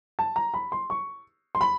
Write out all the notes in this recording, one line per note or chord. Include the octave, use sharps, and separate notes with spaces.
A5
A#5
B5
C6
C#6
C6
B5